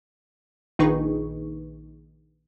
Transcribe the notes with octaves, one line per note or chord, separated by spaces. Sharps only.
A#1 D#3 D#4 G#4 B4 C#6